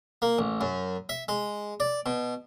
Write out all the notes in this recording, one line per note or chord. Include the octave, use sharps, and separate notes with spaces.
A#3
A1
F#2
E5
G#3
D5
B2